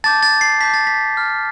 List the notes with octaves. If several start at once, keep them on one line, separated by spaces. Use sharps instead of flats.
A5 D6 G6 A6
A6
C7
A5 D6 G6 B6
A6
B6
B5 F6